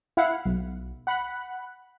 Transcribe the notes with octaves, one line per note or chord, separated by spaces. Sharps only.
E4 F5 F#5
B1
F#5 B5 F#6